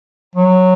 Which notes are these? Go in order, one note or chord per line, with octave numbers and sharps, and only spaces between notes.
F#3